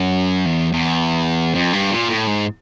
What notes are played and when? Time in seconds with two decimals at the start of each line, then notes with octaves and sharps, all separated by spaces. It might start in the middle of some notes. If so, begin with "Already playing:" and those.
Already playing: F#2
0.46 E2
0.73 E2
1.54 F2
1.73 G2
1.91 A#2
2.09 A2
2.27 G#2